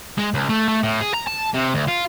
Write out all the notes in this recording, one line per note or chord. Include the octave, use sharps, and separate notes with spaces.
G#3
C#2
A3
A3
A2
G#4
A#5
A5
C3
D2
F4